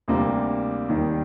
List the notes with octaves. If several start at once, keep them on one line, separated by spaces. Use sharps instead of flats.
D2 C3 G3 A#3 D4
D#2 D#3 G3